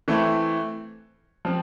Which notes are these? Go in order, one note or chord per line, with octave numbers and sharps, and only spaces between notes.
E3 A3 C4 E4
F3 C4